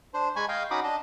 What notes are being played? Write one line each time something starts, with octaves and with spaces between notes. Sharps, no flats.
D4 C5
G#3 G#5 B5 C#6
D#5 F5 G5
C#4 D#4 F#4 B5 D6 D#6
D4 D#5